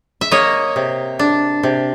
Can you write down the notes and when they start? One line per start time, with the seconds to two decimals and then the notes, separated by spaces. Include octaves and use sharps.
0.21 E5
0.31 A#3 C#5 D#5
0.76 C3
1.19 D4
1.63 C3